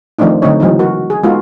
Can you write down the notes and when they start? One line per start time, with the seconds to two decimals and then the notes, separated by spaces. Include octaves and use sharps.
0.19 D#3 F3 A3 C4 D4 D#4
0.42 D3 F#3 A3 C4 D#4 C#5
0.60 C#3 E3 F#3 G#3 C4 D#4
0.79 F#3 F#4 A#4
1.10 G#4
1.23 G#3 B3 D#4 F4 F#4 A4